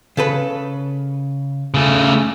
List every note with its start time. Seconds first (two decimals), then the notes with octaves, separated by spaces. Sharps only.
0.17 C#3 A4 B4
1.74 C#3 A3